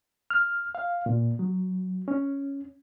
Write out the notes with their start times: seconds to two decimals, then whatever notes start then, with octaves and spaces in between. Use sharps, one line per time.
0.30 F6
0.75 F5
1.06 A#2
1.39 F#3
2.08 C#4